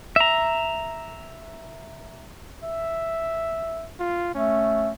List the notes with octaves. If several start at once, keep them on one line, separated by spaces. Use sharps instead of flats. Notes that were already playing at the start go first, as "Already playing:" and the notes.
E5 A#5
E5
F4
A3 C#4